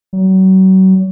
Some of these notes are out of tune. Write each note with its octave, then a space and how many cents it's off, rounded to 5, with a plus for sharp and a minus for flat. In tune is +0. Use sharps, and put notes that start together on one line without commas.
F#3 +35